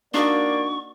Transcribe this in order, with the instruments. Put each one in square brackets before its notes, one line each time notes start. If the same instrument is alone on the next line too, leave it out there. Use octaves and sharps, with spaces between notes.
[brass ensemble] A#3 [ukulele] D4 D#4 F#4 [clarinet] D5 [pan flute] C#6